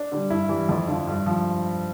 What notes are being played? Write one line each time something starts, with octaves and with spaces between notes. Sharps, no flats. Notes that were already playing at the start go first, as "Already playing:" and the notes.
Already playing: D4
D3 G3
G2 E4
E3 G3
F2
D3 F3
G2
F3